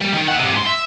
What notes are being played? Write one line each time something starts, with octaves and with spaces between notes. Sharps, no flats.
G3
D#3
E5 F#5
G2 C3
G#2 C6
E5